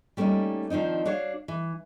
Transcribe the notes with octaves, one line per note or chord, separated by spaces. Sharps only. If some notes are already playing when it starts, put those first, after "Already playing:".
G3 A3 A#3 C#4 D#4
D#3 F3 C4 D4 D#4
D4 F#4 C#5 F5
E3